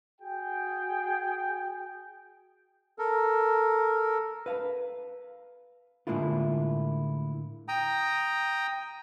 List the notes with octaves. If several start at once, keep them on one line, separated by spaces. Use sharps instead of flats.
F#4 G#4 G5
A4 A#4
B4 F5
A2 D3 G#3 A#3 E4 F4
G5 A#5 D#6